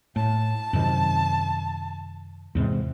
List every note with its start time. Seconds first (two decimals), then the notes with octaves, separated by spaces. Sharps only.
0.16 A2 A5
0.73 F#2 C3 D#3
2.55 E2 G#2 C3